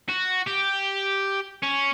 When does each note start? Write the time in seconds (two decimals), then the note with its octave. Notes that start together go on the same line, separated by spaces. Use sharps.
0.09 F#4
0.47 G4
1.63 C#4